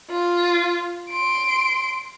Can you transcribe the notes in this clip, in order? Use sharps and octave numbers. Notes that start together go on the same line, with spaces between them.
F4
C6 D7